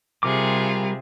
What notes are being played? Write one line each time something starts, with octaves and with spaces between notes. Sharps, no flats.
C3 G3 F4 G#4 A#4 D6